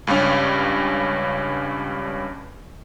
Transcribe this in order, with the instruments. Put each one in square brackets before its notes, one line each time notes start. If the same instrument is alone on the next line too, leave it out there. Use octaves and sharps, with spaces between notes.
[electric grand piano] C#2 G2 G3 C#4